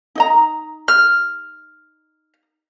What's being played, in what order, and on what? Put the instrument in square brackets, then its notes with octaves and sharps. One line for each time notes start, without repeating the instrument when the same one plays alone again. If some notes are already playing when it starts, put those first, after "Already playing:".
[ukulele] D#4 D#5 A#5
[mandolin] F6